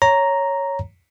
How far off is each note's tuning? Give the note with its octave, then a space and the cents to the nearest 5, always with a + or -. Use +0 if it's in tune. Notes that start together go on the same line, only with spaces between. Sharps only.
C#5 +0 A#5 +0